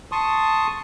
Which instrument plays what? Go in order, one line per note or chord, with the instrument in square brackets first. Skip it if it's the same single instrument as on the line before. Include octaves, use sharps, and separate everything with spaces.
[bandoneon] A5 C6 C#6 D#6